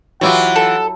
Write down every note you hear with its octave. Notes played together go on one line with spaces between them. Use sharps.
E3 F#3 E4 F4 G4 F#5
A4